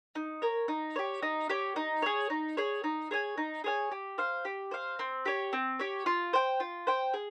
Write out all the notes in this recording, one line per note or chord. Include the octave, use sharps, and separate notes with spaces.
D#4
A#4 C#5
D#4
G4 C#5
D#4
G4 C#5
D#4
G#4 C#5
D#4
G#4 C#5
D#4
G#4 C#5 G#5
D#4
G#4 C#5 G#5
G4
C5 F5
G4
C5 F5
C4
G4 C#5
C4
G4 C#5
F4
C5 G5
F4
C5 G5
G#4